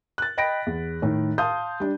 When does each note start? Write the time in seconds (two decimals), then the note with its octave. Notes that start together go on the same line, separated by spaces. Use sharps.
0.18 F#6 A6
0.37 D#5 G5 B5 A#6 B6 D7
0.66 E2
1.02 A2 D#3
1.38 F5 A5 C6 D#6 G6
1.80 G3 D4